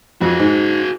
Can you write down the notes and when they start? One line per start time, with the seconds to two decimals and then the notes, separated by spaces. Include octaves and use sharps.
0.21 F2 F#4 G#4
0.39 G#2